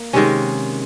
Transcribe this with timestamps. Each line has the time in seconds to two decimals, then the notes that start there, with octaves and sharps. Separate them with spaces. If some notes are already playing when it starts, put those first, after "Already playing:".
Already playing: A#3
0.13 C3 D#3 G#3 C#4